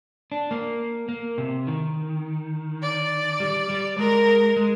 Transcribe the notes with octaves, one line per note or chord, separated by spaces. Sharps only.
D4
A#3
A#3
C3
D#3
D5
G3
G3
G#3 A#4
G#3